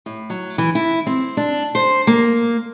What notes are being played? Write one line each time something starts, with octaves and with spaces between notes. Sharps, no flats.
A2
F#3
E3
E4
C4
D4
C5
A#3